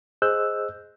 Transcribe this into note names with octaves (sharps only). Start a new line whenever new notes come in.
G#4 C5 D#5 E6 F#6 G6